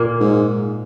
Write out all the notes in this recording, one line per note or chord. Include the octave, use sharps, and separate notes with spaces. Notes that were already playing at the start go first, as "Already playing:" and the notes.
Already playing: A#2 A#3
G#2